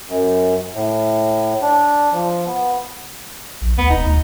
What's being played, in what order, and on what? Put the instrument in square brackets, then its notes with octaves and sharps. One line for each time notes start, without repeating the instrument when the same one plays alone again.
[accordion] F#2
A2
D4
F3
B3
[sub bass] A#1
[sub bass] D2 [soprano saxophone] B3
[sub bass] E1 [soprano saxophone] D#4
[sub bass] D2